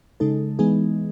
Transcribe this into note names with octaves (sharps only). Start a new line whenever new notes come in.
C#3 G#3 D#4 A4
E3 G#3 B3 D#4 G#4